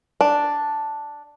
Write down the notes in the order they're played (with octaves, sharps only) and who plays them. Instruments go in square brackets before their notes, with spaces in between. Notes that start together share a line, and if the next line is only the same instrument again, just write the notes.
[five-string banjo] D4